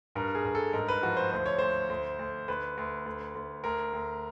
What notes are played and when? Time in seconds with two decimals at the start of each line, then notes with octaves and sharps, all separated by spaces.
0.15 G2 A#4
0.35 G#4
0.45 G2
0.55 A4
0.73 G#2 A#4
0.88 B4
1.03 F3 F#4
1.17 C5
1.31 D2 C5
1.46 C#5
1.59 D2 C5
1.90 D2
2.19 D2
2.48 D2 B4
2.77 D2
3.06 D2
3.35 D2
3.64 D2 A#4
3.93 D2